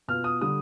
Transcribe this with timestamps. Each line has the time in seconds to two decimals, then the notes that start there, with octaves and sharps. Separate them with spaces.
0.08 B2 B3 F4 F6
0.24 D#6
0.41 D3 G3 D#6